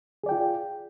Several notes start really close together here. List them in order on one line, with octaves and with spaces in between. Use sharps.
G#4 D5 G5 F4